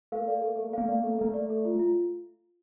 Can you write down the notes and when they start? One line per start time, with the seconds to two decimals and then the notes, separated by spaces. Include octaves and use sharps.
0.12 A3 F5
0.20 A#3
0.26 A3 D5
0.34 A#3
0.41 A3 A4
0.48 A#3
0.56 A3 A4
0.63 A#3
0.70 A3
0.73 A#3 F5
0.85 A3
0.88 A#3 D5
0.99 A3
1.04 A#3 A4
1.14 A3
1.19 A#3 A4
1.28 A3
1.34 D5
1.50 A4
1.65 F4
1.79 F4